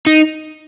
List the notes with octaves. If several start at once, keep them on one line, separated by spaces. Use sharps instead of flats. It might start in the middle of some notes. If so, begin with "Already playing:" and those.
D#4